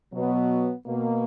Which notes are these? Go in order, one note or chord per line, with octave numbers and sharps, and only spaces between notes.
B2 F#3 B3
B2 A#3